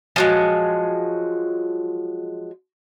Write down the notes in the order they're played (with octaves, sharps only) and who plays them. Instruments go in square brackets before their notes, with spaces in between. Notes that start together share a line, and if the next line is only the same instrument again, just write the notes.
[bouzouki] F3 F#3 G#3